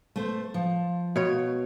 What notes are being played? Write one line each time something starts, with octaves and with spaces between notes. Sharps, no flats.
A3 C5
F3
B2 C#5